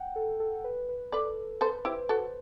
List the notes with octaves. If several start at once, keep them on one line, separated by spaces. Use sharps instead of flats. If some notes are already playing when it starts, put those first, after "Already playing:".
Already playing: F#5 G5
A4
A4
B4
B4
A4 B4 D5
A4 B4 C5
E4 G4 C5
F#4 A4